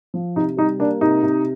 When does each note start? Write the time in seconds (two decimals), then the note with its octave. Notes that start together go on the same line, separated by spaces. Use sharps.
0.14 F3
0.36 C3 D#4
0.57 G3 D#4
0.79 A#3 D4
1.01 C3 D#4
1.23 C3